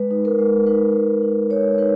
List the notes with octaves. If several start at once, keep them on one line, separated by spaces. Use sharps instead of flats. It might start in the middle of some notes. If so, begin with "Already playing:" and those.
Already playing: G#3 B4
D#4
A#4
G#3
D#4 B4
G#3
D#4
G#3 C#5
D#4 B4